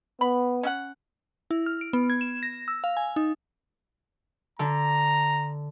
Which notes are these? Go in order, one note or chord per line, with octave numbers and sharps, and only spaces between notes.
B3 B5
C#4 E5 F#5
E4
F6
D7
B3
G#6
E7
A#6
E6
F5
G#5
D#4
D3 A#5